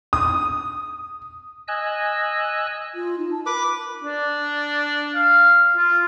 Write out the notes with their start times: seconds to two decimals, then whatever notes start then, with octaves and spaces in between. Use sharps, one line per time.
0.13 D#6
1.68 D#5 G#5 E6 F#6
2.95 F4
3.18 D#4
3.31 A5
3.46 A#4 B4 D6
4.04 D4
5.15 F5
5.77 F4